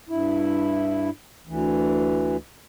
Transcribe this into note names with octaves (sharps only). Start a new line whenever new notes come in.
G2 E4
D2 E3